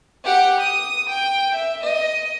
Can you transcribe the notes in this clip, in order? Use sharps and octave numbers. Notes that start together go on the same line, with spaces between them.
G4 F#5
D#6
G5
E5
D#5